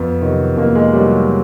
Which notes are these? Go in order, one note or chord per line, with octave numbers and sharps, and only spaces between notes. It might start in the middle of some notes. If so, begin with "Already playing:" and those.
Already playing: F2 B3
C3 D#3 F#3
F2 A#3
G#3
C3 D#3 F#3 G3
F#3